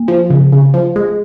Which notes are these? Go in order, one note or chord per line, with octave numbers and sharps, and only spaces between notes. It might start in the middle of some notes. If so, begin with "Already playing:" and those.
Already playing: A#3
F3
C#3
C#3
F3
G#3